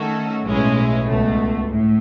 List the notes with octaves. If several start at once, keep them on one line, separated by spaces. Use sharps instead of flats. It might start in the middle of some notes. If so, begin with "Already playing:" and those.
Already playing: D#3 A3 C#4 F#4 A4
B1 A2 G#3 C#4 E4
C#2 B2 A3
A2